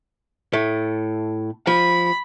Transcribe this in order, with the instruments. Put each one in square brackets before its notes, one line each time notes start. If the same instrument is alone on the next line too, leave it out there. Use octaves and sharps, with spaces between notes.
[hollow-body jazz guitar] A2 A3
[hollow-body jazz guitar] F3 [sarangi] B5